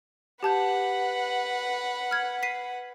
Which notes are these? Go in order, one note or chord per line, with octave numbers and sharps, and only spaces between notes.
G4 B4 F#5 A5 G6
F6 G#6
B6 C7 D#7